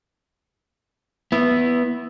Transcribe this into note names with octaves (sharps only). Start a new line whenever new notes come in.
B3 E4